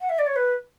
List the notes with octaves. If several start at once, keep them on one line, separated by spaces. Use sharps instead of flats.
F#5
E5
D5
C#5
B4